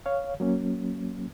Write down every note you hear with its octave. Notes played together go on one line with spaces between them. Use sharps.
C#5 F5
F#3 A#3 C#4